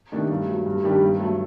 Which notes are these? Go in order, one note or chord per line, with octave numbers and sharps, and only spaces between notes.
C3 D#3 A3 D4
G2
F#3 A3
G2
D#3 G3 D4 G4
G2
F#3 A3